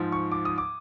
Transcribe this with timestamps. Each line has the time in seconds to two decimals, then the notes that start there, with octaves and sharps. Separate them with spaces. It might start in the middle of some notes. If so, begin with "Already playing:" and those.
Already playing: G#2 F3
0.12 C#6
0.32 D6
0.45 D#6
0.58 D6